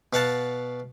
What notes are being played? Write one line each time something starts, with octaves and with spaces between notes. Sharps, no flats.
B2 F5 F#5 A5